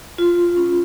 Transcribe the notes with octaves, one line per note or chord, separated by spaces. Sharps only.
F4
C#4